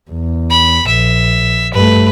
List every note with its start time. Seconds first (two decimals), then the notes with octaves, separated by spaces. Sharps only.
0.11 E2
0.50 B5
0.87 A#1 E5
1.74 G2 A3 B4